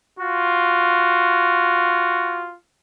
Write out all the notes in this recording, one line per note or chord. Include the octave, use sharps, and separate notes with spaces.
F4 F#4